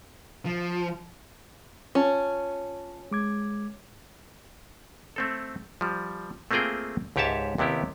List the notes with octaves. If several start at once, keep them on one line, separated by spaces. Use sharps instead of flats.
F3
C#4 F4 C#5 A5
G#3 D6 G#6
A3 C4 A4
F3 G3
A3 A#3 C4 F4 G#4 G5
C#2 G#2 G4 C#5 E5 A5
D#2 C3 B3 E4 G4